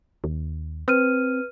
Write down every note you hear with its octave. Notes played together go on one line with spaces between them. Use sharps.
D#2
C4 B4 F6 D#7